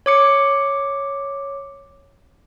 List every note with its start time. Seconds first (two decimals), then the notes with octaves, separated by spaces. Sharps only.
0.06 C#5 D6 C#7